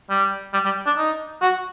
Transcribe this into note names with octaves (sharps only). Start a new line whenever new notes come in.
G3
G3
G3
D4
D#4
F#4